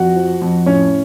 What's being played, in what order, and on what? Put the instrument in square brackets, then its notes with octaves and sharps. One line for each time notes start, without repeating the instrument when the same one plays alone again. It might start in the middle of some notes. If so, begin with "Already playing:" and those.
Already playing: [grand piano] F2 F#4 F#5
F3
F2
A2 C#4 C#5